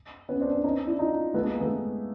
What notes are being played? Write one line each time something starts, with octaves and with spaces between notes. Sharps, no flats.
B3 C#4
C4 D4
C4 D4
C#4 D#4
D4 E4
D#4 F4
A3 B3
G#3 A#3
A3 B3